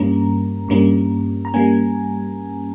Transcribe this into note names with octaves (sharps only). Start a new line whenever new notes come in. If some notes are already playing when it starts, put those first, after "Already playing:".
Already playing: G2 G3 A#3 C#4 A#5
G2 G3 A#3 C#4
A#5
G3 A#3 C#4 G#5